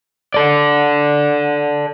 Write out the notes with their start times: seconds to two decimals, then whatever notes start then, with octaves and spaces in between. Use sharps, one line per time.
0.34 A4 D5